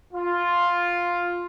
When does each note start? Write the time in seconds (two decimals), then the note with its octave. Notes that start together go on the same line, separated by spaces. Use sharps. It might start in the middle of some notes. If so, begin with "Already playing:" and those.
0.14 F4